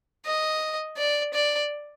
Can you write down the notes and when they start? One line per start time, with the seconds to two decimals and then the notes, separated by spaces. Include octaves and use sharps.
0.26 D#5
0.97 D5
1.34 D5